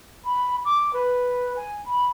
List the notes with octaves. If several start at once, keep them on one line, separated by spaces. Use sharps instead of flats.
B5
D6
B4
G#5
B5